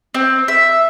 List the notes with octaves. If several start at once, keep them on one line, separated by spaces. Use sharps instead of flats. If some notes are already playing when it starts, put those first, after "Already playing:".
C4
E5